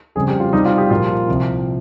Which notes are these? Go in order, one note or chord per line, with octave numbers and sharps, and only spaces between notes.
F2 C#3 G3 C4 G#4
G4
F4
C3 G3 C4 D#4
F4
G4
A#2 F3 A#3 F4
C2 C3 F3